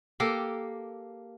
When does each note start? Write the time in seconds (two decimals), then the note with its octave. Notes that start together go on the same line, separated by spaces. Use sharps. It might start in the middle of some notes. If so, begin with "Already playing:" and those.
0.20 A#3 G4 A4 A#4